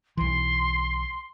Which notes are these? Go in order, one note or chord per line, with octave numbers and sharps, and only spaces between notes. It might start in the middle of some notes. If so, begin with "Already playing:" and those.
B1 E3 C6